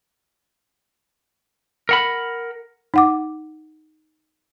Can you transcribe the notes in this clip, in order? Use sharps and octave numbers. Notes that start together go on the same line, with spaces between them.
A#4 F#5 B5
D#4 F#5 D6